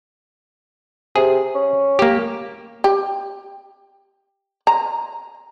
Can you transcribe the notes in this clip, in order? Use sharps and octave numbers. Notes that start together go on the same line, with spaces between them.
C3 G#4
C#4
A#3 G4
G4
A#5